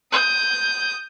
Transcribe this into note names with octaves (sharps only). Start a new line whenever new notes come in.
D#6 G6